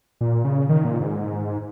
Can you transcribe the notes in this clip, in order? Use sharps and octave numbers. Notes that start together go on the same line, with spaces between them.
A#2
C#3
D#3
A#2
G#2